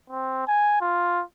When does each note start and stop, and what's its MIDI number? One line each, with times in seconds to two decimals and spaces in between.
0.10 0.47 60
0.47 0.78 80
0.81 1.22 65